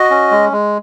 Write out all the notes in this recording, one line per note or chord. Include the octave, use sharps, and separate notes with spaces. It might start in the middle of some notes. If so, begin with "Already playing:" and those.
Already playing: F#4 D#5
C#4
G#3
G#3